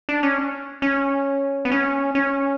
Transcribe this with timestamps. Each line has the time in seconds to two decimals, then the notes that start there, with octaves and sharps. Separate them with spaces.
0.09 D4
0.23 C#4
0.82 C#4
1.65 B3
1.72 C#4
2.15 C#4